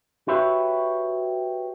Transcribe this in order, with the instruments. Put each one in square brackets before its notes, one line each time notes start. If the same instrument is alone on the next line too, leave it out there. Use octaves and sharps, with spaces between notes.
[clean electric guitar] F#4 G4 B4 C#5 E5